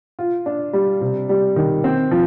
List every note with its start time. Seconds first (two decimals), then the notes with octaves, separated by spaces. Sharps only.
0.19 F4
0.46 D4
0.73 G3
1.01 C3
1.29 G3
1.56 D#3
1.84 C4
2.11 F3